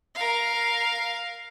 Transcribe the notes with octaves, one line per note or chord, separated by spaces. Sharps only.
A#4 F5